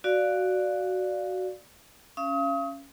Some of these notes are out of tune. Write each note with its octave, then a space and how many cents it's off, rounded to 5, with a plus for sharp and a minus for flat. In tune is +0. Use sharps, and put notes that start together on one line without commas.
F#4 +5 D5 +0 F5 +0
C#4 +0 F5 -35 D#6 +35